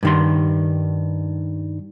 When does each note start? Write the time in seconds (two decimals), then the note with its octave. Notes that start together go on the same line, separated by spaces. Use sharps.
0.03 G2 D#3 C6